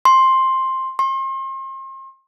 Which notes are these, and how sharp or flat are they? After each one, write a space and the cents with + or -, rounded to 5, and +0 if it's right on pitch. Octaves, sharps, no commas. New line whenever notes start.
C6 +10
C6 +40